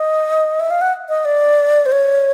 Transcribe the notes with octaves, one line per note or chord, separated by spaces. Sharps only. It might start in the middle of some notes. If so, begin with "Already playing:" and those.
Already playing: D#5
E5
F5
F#5
D#5
D5
C5
C#5